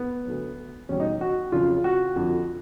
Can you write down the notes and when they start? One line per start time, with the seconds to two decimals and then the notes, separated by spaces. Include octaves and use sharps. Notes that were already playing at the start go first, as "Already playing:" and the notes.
Already playing: B3
0.25 D2 D3 F#3
0.89 E2 B2 G3 C#4
1.00 D#4
1.21 F#4
1.52 F2 C#3 F#3 F4
1.84 F#4
2.16 F2 D3 F3